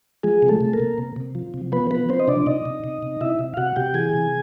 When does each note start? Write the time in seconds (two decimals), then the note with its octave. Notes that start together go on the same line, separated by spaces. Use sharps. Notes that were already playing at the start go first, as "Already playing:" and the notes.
0.23 F3 G#3 G#4
0.42 C3
0.48 A3 A4
0.61 C3
0.73 A#3 A#4
0.80 C3
0.98 C3
1.16 C3
1.35 F3
1.54 C3
1.72 F3 B3 B4
1.91 F3 B3 B4
2.09 F3 C4 C5
2.20 D#5
2.28 C3 D4 D5
2.46 C3 D#4 D#5
2.65 C3
2.84 C3
3.03 C3
3.21 C3 E4 E5
3.39 C3
3.54 F5
3.57 C3 F#4 F#5
3.76 C3 G4 G5
3.94 E3 G#4 G#5
4.13 C3